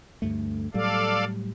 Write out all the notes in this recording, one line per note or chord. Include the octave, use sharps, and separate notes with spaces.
D2 G2 A3
A2 F#3 G3 A4 D5 F5